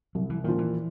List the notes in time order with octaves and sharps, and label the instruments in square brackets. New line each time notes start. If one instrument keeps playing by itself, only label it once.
[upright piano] C2 [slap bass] F#3
[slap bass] E3
[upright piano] A#2 F3 [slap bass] D#3
[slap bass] E3